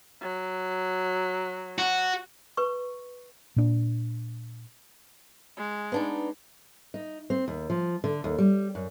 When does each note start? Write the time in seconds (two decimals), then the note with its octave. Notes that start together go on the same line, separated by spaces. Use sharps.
0.21 F#3
1.78 F#4
2.57 B4 C#6
3.56 A#2 D4
5.57 G#3
5.92 B3 D4 D#4
6.94 D#4
7.30 C4
7.48 D#2
7.70 F3
8.04 D3
8.24 D#2
8.38 G3
8.75 F#2